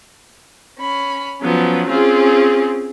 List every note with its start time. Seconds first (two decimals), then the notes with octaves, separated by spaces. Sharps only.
0.79 C#4 B5
1.40 F3 F#3 B3 C#4
1.87 C4 C#4 F4 G#4